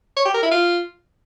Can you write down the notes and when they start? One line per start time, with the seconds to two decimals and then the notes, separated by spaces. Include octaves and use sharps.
0.16 C#5
0.25 G4
0.34 A#4
0.43 E4
0.51 F4